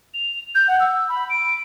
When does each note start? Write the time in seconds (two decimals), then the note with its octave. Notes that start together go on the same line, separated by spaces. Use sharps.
0.14 F7
0.55 G6
0.68 F#5
0.80 E6
1.09 B5
1.30 D7